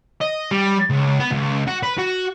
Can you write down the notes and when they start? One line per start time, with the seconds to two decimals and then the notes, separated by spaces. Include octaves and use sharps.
0.21 D#5
0.51 G3
0.91 C#2
1.20 B3
1.31 C#2
1.67 F#4
1.83 B4
1.98 F#4